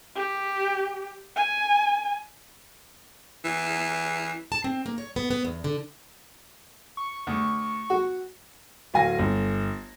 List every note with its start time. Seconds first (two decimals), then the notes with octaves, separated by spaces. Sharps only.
0.16 G4
1.36 G#5
3.44 E3
4.52 A5
4.64 C4
4.86 A#3
4.98 C#5
5.16 B3
5.30 B3
5.45 E2
5.64 D3
6.97 C#6
7.27 D2
7.90 F#4
8.94 D1 F5 G#5 A#6
9.19 G1